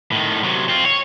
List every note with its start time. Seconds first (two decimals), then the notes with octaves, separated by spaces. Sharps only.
0.12 A2 D#3
0.44 C3 F#3
0.69 C4 F4
0.85 C#5